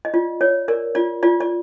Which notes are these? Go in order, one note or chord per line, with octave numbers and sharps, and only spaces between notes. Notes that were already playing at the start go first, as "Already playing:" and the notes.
D#5
F4 D5
C#5 D5
A#4 D5
F4 D5
F4 D5
D5